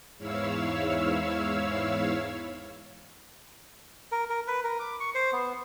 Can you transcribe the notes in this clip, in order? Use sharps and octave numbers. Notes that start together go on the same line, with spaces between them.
E2 G#2 E4 C#5 F5 E6
A#4
A#4
B4
A#4
D6
C#6
C5
B3